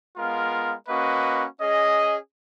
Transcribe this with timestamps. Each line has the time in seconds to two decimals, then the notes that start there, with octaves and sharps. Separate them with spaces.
0.17 G#3 B3 F4 A#4 F5
0.88 A#3 C#4 F#4 B4 D#5
1.59 C#4 G#4 D#5